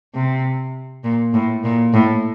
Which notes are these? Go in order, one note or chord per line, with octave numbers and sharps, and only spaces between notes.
C3
A#2
A2
A#2
A2